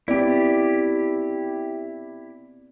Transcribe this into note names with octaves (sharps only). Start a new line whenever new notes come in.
B3 C4 E4 G4 D5